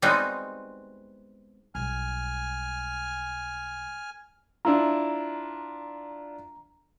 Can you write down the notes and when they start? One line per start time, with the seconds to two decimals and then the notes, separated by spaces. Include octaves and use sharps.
0.02 G3 G#3 B3 C4 D#4 F#4
1.75 B1 G3 G#5 F6
4.65 D4 E4 F4 A#5